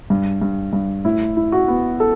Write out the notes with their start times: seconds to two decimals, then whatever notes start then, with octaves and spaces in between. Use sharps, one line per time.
0.10 G2
0.42 G2
0.73 G2
1.05 A2 E4
1.37 E4
1.52 F#4
1.68 B3
2.00 A4